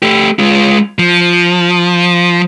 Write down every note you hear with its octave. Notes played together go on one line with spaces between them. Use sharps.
A3 G4
G#3 F4
F3